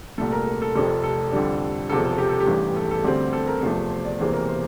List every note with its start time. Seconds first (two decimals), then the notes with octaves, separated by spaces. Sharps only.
0.18 C2 A#2 A3 A4
0.32 A#4
0.47 A#4
0.62 A4
0.76 F1 F2 C3 A4
1.03 A4
1.32 F2 D3 G3 D4
1.89 E1 E2 C3 F3 A4
2.05 A4
2.18 G4
2.29 A4
2.40 G4
2.47 A1 G2 E3
2.76 A4
2.91 A4
3.04 D2 D3 G3 C4 G4
3.33 A4
3.48 A#4
3.62 E2 C3 F3 A3 C5
3.91 C5
4.05 D5
4.20 E1 E2 C3 E3 A#3 C5
4.34 A#4
4.49 C5